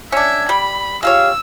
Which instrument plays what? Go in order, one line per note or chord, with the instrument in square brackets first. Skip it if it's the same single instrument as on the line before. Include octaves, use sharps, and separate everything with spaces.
[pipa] C#4 D4 [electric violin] E5 G#6
[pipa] G3 [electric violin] B5
[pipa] G#3 F4 C#5 [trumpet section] G4 F5 [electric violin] E6